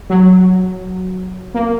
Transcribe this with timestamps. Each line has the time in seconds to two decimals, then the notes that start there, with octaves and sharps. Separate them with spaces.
0.10 F#3
1.54 A#3